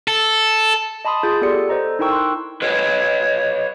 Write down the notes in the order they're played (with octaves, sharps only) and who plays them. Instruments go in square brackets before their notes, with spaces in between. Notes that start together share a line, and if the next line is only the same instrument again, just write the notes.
[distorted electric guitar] A4
[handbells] D#5 A5 B5 C6 D#6
F4 G#4 G6 A6
B3 G4 A4 D5 C#7
A4 C5 D#5 A#5
D#4 E4 A#4 G5 C#6 E6
C6 F#6
[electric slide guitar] B4 C#5 D#5